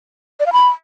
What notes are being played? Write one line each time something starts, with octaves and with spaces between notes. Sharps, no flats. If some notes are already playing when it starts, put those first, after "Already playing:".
D5
F5
B5